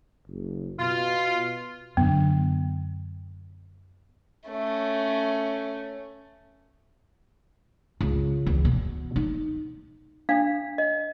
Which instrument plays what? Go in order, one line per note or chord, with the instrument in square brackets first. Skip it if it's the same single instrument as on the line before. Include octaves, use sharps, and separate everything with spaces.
[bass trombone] F#1
[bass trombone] B2 [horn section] F4
[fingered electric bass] F#2 D3 [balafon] B3
[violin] A3 C#4
[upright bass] C#2
E2
B2
D#4
[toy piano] D4 F5
D#5